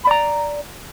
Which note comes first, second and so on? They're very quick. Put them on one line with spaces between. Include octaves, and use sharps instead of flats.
B5 D5 A#5